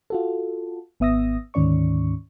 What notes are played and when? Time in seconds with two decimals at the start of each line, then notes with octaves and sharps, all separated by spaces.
0.10 F4 F#4 A4
1.00 G#1 B3 E5 D#6 E6 A#6
1.54 D2 G#2 D#3 C#4 D5 C#6